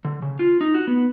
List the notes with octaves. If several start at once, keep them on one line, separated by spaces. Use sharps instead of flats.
D3
C#3
F4
D#4
F#4
B3